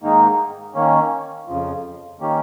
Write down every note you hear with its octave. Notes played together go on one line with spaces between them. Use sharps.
G#2 D#3 A#3 D#4
D#3 A#3 C#4
F2 C#3 F3
D#3 A#3 C#4 G4